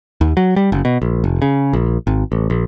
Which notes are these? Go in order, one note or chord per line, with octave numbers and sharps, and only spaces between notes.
D#2
F#3
G3
F#1
B2
A#1
F1
C#3
A#1
G#1
A1
A#1